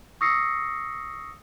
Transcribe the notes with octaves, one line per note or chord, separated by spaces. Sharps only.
C#6 D#6 E6 A#6 C7 C#7